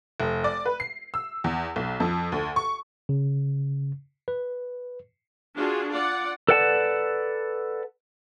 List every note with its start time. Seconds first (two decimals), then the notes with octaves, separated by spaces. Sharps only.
0.20 F1
0.44 D5
0.65 B4
0.80 C7
1.14 E6
1.44 E2
1.76 B1
2.00 F2
2.32 D2
2.56 C#6
3.09 C#3
4.28 B4
5.55 D4 F4 F#4 G#4
5.90 F4 D5 F#5
6.49 A4 B4 D5 F#5 A5